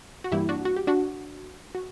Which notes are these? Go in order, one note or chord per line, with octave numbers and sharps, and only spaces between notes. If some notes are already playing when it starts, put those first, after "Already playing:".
F#4
G2 E3 G3 A#3 E4 G4
D4 F#4
F#4
G4
D4 F#4
F#4